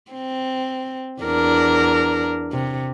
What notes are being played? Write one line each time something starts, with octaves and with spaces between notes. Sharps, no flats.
C4
E2 D4 A#4
C3